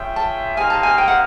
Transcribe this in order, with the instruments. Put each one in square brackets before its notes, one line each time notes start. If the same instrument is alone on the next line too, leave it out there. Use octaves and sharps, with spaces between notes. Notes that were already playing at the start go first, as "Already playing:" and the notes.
Already playing: [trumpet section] F4 G#4 C#5 E5 G5
[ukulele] A5
[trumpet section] A#3 D#4 G4 C5 F5 [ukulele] G#5
[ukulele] A5
G#5
G5
F#5